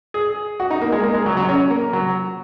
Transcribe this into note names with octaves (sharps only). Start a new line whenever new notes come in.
G#4
F#4
D#4
A#3
G#3
A#3
G#3
F#3
F#3
C#4
A#3
F#3